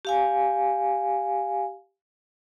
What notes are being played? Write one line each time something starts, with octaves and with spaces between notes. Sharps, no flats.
G4 F5 G#5